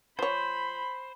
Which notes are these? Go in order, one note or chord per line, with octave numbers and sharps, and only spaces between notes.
F3 C5 C#5 B5